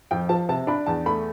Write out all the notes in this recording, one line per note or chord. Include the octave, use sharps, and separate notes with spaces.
F2 G5
F3 A5
C3 A5
D4 B5
E2 A5
A3 B5